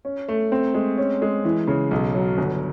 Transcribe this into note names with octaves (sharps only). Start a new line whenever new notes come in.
C#4
A3
C4
G#3
C#4
G#3
E3
C#3
B1
F#3
G1